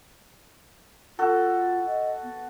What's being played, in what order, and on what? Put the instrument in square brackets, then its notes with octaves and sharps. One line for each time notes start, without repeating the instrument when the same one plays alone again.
[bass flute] F4 [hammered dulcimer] F#4 A4
[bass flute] D#5
B3